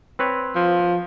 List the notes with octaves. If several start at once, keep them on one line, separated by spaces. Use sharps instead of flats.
C4 B4 C#5
F3